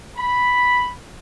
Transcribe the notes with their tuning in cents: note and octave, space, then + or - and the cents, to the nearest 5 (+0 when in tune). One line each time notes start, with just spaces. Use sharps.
B5 +0